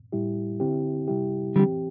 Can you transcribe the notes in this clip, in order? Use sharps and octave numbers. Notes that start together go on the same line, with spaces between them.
A2 G3 E4 G4
D3 C4 E4 G4
C3 G3 E4 G4
D3 E3 G3 C4 G4